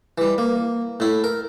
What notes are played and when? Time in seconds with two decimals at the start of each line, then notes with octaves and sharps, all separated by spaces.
0.18 E3 G3
0.38 A#3
1.00 A2 E4
1.24 A#4